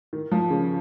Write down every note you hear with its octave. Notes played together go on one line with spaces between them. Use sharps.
D#3
F3
C#3